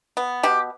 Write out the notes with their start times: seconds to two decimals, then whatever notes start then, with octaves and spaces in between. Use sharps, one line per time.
0.17 B3
0.43 B2 G4